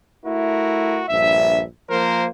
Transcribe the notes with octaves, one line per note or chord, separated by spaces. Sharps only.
A3 E4 F#4 A#4
A#1 G2 E5
F3 A#3 A#4 C5